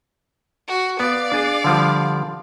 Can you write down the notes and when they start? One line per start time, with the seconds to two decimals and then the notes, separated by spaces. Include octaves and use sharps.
0.67 F#4
1.00 B3 D5 F5
1.32 D4 G#4
1.64 D3 F3 G3